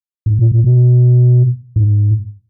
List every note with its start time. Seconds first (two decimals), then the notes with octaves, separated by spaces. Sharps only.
0.26 G#2
0.39 A#2
0.51 A#2
0.64 B2
1.76 G#2